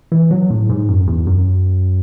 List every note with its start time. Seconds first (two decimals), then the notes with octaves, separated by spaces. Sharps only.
0.12 E3
0.31 F#3
0.50 A2
0.69 G#2
0.88 F#2
1.07 E2
1.27 F#2